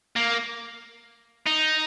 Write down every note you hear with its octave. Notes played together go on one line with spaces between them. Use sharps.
A#3
D#4